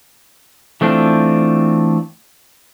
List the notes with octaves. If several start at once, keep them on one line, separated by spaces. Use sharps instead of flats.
E3 A3 C4 D4 F4